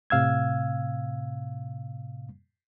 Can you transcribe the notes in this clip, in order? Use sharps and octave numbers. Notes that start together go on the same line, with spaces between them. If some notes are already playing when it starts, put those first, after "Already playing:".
A2 C3 F5 E6 G#6